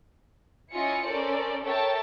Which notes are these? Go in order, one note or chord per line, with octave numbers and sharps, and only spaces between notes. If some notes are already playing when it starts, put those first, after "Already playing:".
C#4 E4 F4 D#5 G#5 C#7
C#4 A4 A#4 C5 D5
A4 A#4 C#5 E5 G5 A5